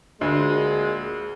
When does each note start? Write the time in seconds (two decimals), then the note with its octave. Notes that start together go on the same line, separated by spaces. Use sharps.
0.21 D2 A#2 G#3